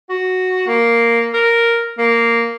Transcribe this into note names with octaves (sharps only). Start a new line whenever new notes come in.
F#4
A#3
A#4
A#3